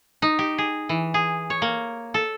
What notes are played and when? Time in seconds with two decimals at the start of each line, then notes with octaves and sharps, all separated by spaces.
0.22 D#4
0.39 G4
0.58 G#4
0.89 E3
1.14 G#4
1.50 C#5
1.62 A#3
2.14 A4